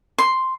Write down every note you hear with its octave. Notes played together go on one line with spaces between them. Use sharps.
C6